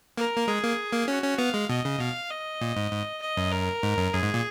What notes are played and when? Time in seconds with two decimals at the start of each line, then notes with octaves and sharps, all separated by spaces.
0.17 A#3 A#4
0.38 A#3
0.48 G#3 G#4
0.63 A#3
0.93 A#3
1.08 C#4 F#4
1.23 C#4
1.38 B3 F5
1.54 G#3
1.69 B2 D#5
1.85 C#3
1.99 B2 F5
2.30 D#5
2.61 A#2
2.76 G#2
2.91 G#2
3.21 D#5
3.37 F#2
3.52 A#4
3.83 G#2
3.97 F#2
4.13 F#2 G#4
4.23 G#2
4.34 A#2